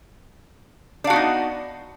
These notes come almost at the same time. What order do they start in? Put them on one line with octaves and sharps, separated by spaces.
D4 F5 F#4 B3 D#4